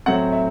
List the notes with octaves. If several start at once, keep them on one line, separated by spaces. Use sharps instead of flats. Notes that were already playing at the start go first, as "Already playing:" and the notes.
A2 F#3 A3 C4 F#5
E5